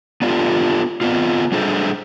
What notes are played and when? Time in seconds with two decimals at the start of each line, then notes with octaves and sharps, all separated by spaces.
0.22 B3 D4 F4 G4 A4
1.01 B3 C4 F4
1.52 G3 D4 G#4 A4 C5